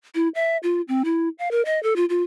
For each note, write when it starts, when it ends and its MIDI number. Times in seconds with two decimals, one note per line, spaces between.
0.15 0.28 64
0.35 0.57 76
0.63 0.81 65
0.88 1.03 60
1.05 1.29 64
1.39 1.51 77
1.51 1.64 70
1.65 1.81 75
1.83 1.96 69
1.96 2.05 65
2.09 2.23 65